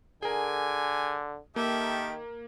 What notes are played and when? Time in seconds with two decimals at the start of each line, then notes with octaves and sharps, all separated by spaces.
0.22 D3 G#4 A#4 G#5
1.56 D#3 A#3 G4 A4 E5